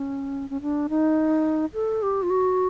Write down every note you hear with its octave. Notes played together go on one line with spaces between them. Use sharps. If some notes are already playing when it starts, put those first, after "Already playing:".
Already playing: C#4
C#4
D4
D#4
A4
G4
F4
F#4